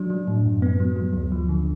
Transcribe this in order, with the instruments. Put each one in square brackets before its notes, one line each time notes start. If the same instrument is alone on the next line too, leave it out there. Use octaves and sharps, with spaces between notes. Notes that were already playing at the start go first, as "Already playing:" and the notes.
Already playing: [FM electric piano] F#3 D4
F#3
A2
F#2
B3
F#3
F#3
D2
F3
D3